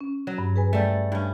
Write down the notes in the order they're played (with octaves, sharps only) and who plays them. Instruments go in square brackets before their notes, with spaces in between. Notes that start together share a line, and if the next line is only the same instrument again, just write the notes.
[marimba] C#4
[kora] F#3
[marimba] G2
G#4 B4 G#5
[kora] G3 A3
G2 C#4